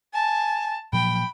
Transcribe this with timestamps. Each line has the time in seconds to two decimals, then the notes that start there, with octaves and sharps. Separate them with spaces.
0.13 G#5 A5
0.93 A#2 F3 F#3 G5 B5